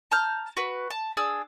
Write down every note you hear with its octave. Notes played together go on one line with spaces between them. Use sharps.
A5 A#5 F6 G6
F#4 B4
A5
D4 G#4 E6